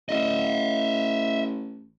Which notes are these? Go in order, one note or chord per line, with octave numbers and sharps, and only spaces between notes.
A1 D#5 E5